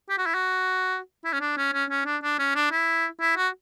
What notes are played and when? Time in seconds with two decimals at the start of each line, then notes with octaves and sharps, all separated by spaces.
0.09 G4
0.18 F#4
0.26 E4
0.34 F#4
1.24 E4
1.33 C#4
1.40 D4
1.57 C#4
1.73 C#4
1.90 C#4
2.06 D4
2.23 D4
2.39 C#4
2.55 D4
2.71 E4
3.20 E4
3.37 F#4